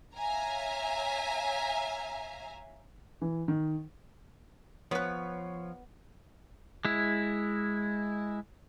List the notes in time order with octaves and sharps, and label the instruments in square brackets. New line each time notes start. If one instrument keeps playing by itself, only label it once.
[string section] C#5 E5 F5 G#5 A#5
[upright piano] E3
D#3
[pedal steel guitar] F3 [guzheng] B3 B4 [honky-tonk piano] C#5
[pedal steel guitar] G#3 E4